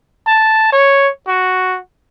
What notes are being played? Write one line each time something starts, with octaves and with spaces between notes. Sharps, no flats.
A5
C#5
F#4